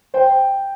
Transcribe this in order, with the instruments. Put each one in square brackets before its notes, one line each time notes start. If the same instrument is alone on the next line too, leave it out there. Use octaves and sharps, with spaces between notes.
[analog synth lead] C5 [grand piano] G5